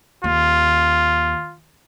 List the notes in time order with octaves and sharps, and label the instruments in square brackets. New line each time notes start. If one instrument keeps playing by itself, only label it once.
[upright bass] D#2 [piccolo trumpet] F4